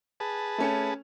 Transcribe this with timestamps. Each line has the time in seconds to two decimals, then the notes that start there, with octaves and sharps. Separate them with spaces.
0.20 G#4 B4 A5
0.58 A3 C#4 A4